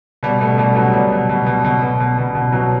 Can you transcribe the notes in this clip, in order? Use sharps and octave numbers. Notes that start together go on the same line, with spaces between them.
B2 G3
B2 A3
B2 G3
B2 F#3
B2 G3
B2
B2
B2
B2
B2
B2
B2
B2
B2 F#3